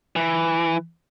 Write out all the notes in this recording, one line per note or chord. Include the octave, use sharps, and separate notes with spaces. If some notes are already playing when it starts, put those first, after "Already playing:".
E3